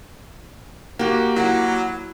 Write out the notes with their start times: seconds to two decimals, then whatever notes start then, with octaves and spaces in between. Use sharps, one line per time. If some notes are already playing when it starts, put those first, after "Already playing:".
0.99 A#3 F#4 G4
1.36 F#3 E4 D5 F#5